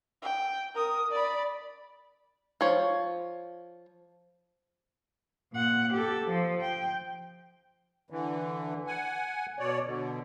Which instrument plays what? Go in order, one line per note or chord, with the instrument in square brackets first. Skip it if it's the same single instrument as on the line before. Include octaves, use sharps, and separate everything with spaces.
[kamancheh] G5
A#4 D#6
D5 B5
[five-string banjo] F3 C#5
[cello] A#2 F#5
G4 A4
F3
G5
[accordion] D3 E3
F#5 G#5
B2 C#5 D5
B2 D3